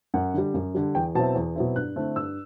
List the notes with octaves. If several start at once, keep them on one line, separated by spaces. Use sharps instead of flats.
F#2 F#5
D3 G3
F#2
D3 G3
E2 G5
B2 F#3 C4 E4 A5
E2
B2 F#3 C4 E4
G2 F#6
D3 A3 C4 E4
G2 E6